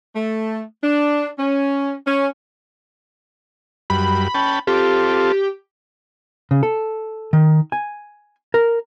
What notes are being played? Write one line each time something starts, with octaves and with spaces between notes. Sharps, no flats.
A3
D4
C#4
C#4
F#2 G3 B5
C#4 G5 A5
C4 F4 G4 A4
C#3
A4
D#3
G#5
A#4